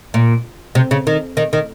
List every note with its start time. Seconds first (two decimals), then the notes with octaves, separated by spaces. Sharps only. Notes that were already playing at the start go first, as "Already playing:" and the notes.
0.14 A#2
0.75 C3
0.91 C#3
1.07 D#3
1.37 D#3
1.53 D#3